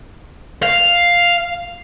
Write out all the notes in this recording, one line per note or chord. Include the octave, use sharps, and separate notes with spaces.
F5